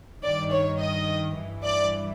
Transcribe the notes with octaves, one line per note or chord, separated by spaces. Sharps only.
G2 D#3 D5
C#5
D#5
G2 E3
D5